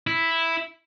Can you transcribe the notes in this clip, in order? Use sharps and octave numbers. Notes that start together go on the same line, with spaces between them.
E4